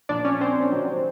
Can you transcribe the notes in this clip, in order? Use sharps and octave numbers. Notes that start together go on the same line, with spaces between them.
A#2 F3 D4 D5
C#4 C#5
C4 C5
C3 D#3 F#3